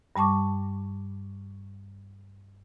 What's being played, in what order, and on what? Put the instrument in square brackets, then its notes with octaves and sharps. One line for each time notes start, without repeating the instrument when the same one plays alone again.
[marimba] G2 G3 A5 C#6 D6